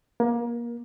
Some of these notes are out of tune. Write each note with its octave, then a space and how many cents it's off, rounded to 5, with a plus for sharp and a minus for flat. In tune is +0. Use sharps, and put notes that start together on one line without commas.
A#3 +25